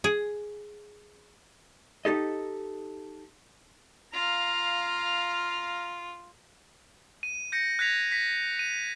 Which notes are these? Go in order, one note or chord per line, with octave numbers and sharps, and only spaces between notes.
G#4
D#4 G4 A4 D#5
F4 F5 A#5
D#7
G6 A#6 C#7
F#6 G#6 A#6 B6 F7
A#6 B6
D#7